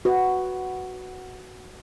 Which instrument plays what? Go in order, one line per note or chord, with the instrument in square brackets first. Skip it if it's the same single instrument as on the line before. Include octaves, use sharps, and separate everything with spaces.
[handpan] F#4 B4